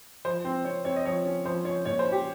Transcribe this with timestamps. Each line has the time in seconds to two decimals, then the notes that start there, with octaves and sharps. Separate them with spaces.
0.25 F3 C5
0.45 C4
0.65 C4 C#5
0.85 C4 C#5
0.96 D#5
1.05 F3 C#5
1.26 C#4
1.46 F3 C5
1.65 C#4 C#5
1.86 A#2 C#5
1.99 C5
2.05 C#4
2.12 G4